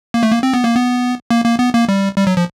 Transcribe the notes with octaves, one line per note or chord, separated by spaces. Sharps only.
A#3
A3
A#3
C4
B3
A#3
B3
A#3
A#3
B3
A#3
G3
G3
F#3
F3